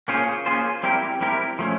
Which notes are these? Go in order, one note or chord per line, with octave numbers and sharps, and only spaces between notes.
A#3 C#4 F4 G#4 C5
A#3 C#4 F4 G#4 C5
G3 C4 E4 G4 A#4
G3 C4 E4 G4 A#4
F3 A3 C#4